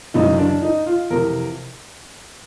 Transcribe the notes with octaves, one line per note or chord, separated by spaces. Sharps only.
F#2 C#3 E3 D#4
D4
D#4
F4
F2 C3 E3 A#4